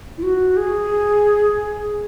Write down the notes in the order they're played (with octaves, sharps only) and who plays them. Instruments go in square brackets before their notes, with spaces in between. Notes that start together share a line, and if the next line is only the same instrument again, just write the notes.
[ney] E4
F#4
G#4